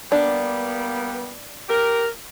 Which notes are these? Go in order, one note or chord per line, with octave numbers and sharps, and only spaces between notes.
G3 A#3 B3 D4
G4 A#4